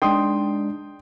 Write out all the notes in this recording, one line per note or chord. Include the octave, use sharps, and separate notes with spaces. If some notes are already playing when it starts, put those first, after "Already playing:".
G#3 D4 D#4 G5 C6 D#6